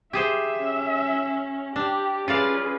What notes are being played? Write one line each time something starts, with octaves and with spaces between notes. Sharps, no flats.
G4 G#4 C5 E5
C#4
D4 G4
C#4 F4 G#4 B4 D5 F5